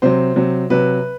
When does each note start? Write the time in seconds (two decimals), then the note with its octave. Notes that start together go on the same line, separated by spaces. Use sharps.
0.02 C3 F#3 C5
0.36 C3 F#3
0.70 C3 F#3 B4